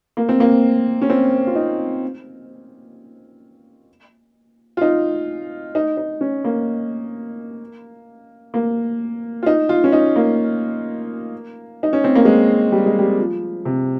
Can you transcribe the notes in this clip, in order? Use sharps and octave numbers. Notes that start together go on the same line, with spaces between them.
A#3
C4
A#3
C#4
C4
F4
D#4
F4
D#4
D#4
D#4
C#4
A#3
A#3
F4
D#4
F4
C#4
D#4
A#3
D#4
C#4
C4
A#3
G#3
G3
G#3
G3
F3
C3